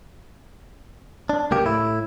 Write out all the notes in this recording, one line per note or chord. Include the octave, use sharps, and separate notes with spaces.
D4
C#2 A#3 G4
A2 E4